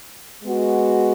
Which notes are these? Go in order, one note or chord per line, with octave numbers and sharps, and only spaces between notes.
G#3 B3 F#4